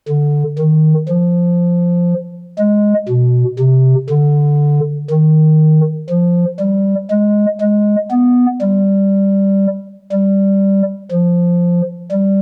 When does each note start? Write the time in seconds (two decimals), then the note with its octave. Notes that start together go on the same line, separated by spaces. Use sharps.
0.08 D3
0.59 D#3
1.09 F3
2.59 G#3
3.09 B2
3.60 C3
4.10 D3
5.11 D#3
6.10 F3
6.60 G3
7.11 G#3
7.61 G#3
8.11 B3
8.62 G3
10.12 G3
11.12 F3
12.12 G3